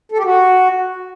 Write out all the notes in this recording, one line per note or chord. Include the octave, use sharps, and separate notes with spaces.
A4
G4
F#4